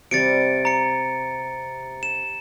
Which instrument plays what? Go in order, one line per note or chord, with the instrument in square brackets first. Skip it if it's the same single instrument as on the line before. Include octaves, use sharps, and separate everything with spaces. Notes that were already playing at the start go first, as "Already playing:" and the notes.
[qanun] C3 G3 [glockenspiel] A6 C#7 D7
[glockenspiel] A#5 C#7
E7